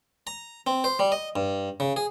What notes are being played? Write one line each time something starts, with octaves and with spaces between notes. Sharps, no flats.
A#5
C4
C5
G3
D#5
G2
C#3
G#4